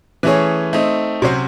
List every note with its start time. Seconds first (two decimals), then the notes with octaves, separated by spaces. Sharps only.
0.23 E3 A3 C#4 G#4 C#5
0.73 A3 C4 D#4
1.22 C3 F#3 C#4 F#4 C5